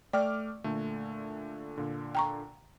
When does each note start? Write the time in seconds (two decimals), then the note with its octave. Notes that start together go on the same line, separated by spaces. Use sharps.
0.13 A3 D5 G5 D6 F6
0.64 A#2 D3 A3
1.78 A#2 D3
2.15 G5 A#5 C#6